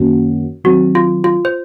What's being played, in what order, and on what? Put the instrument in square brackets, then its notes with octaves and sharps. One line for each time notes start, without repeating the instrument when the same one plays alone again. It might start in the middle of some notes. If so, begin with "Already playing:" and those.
Already playing: [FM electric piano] F#2 D#3 A#3 C#4 F#4
[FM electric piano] D#3 F#3 C4 [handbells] F#4
[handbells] F4
F4
C5